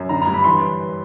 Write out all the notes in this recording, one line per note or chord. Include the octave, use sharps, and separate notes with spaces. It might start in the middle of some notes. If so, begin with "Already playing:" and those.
Already playing: F#2
D3 A#5
A#5
G2
B5
E3 C6